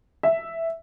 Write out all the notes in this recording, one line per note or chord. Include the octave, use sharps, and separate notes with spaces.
E5